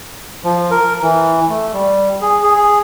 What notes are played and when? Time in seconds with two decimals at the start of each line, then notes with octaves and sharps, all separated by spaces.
0.44 F3
0.71 A#4
1.02 E3
1.49 A3
1.73 G3
2.21 G#4
2.43 G#4
2.55 G#4